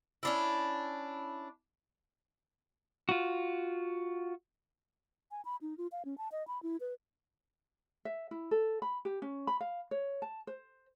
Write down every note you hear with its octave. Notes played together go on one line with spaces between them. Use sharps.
C#4 D4 E4
F4 F#4
G#5
B5
D#4
F4
F5
C#4
A5
D#5
B5
E4
B4
E5
E4
A4
B5
G4
C#4
B5
F5
C#5
A5
C5